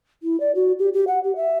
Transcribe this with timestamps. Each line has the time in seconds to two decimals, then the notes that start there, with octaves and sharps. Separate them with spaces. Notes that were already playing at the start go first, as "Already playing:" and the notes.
0.23 E4
0.40 D5
0.55 F#4
0.79 G4
0.93 G4
1.07 F#5
1.24 G4
1.36 E5